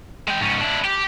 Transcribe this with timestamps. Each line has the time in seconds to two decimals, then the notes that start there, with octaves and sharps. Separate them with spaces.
0.28 G#3 G5
0.40 G#2 C#4
0.60 D4 E4
0.85 G4